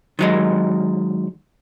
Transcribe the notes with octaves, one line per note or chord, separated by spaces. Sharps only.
D#3 F#3 G#3